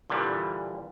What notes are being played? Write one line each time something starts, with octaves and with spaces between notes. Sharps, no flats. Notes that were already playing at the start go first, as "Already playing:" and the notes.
A#2 D3 E3 G3